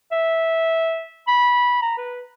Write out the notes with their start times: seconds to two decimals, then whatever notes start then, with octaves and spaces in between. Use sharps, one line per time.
0.12 E5
1.28 B5
1.82 A#5
1.98 B4